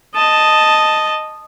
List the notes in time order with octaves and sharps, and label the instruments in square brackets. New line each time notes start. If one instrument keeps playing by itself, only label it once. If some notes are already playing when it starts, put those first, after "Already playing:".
[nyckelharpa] D#5 A5